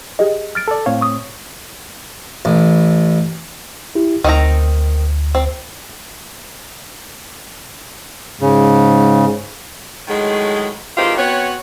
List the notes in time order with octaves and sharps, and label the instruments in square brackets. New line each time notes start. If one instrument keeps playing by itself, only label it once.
[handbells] G4 G#4 D#5
F6 A6 D7
[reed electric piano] A4 D5
[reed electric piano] A2 C4 C#5 [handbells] F5
[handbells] C#6 D#6
[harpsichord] A1
[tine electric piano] E4 G4
[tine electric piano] D2 [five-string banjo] D#3 C4 A#5
[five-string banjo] C4
[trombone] G#2 [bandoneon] C#3
[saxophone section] A2 D#3 F#3 G#3
D#3 E3 G#3 C4 F4 G4
B3 C4 F#4 C#5